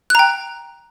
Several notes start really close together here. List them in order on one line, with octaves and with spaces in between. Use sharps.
F#6 A#5 G5